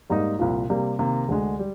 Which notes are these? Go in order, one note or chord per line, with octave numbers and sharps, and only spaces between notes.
G#2 G3 A#3 D#4
C2 A#2 F3
C3 G3 A#3
C3 D#3 A#3
D2 D3 G#3
G3